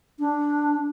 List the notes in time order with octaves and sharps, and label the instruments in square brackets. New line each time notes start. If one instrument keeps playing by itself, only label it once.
[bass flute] D4